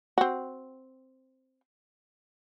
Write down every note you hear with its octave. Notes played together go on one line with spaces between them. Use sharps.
C4 F#4